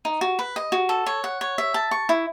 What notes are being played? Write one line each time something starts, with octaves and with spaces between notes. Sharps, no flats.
D#4
F#4
B4
D#5
F#4
A4
C#5
F#5
C#5
E5
A5
C#6
E4